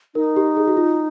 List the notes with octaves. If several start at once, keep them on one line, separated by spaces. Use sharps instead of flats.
D#4 A#4
G4
G#4
F#4
F4